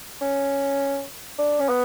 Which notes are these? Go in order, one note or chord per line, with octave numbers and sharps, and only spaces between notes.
C#4
D4
C#4
B3